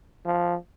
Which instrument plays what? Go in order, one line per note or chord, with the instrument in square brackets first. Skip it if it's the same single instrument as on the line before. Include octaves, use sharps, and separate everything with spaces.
[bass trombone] F3